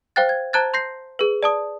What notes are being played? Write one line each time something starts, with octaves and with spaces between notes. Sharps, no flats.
C5 F5 G5 F#6 A6
G#6
C5 A5 A#5 F#6 G#6 A6
C6 G6 A#6 C7
G#4 B4
D5 A5 D#6